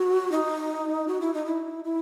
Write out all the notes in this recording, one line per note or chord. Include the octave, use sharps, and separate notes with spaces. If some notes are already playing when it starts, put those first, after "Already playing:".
Already playing: F#4
D#4
F#4
E4
D#4
E4
E4